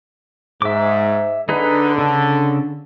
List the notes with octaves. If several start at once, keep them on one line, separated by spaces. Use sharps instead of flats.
G#2 E5 D6
D3 D#4 G#4 B4
C#3 A4